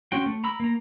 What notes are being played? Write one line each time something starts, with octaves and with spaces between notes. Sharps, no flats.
C4 C#4 F#4 G5
A3
A#5 B5 E6
A#3 A#5